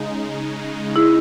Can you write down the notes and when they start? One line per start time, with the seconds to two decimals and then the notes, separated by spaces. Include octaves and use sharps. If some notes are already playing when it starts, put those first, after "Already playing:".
Already playing: C#3 G#3 D#4
0.96 E4 G#4